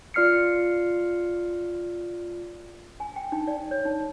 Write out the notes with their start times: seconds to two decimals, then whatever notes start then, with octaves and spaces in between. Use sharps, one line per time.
0.14 F4 D5 F6 C7 C#7
3.00 G#5
3.16 G5
3.32 D#4
3.47 D5
3.71 C#5
3.85 D#4